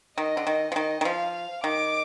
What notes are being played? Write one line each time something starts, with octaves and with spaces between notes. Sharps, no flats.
D#3 D#5
D3
D#3
F3
D#3 D#5
D#3
F3 F5
D#3 D6